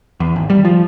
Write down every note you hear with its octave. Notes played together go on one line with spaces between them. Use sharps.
E2
G#1
G3
F3